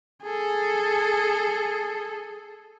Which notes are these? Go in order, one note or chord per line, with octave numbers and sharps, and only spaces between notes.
G#4 A4